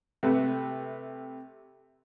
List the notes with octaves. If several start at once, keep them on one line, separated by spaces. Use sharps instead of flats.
C3 A3 B4